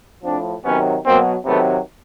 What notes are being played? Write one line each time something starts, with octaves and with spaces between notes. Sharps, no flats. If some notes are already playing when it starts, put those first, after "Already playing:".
A2 F3 C4 D4
C3 D#3 F#3 B3 C#4
B2 F#3 A#3 C4
C3 D#3 F#3 A3 B3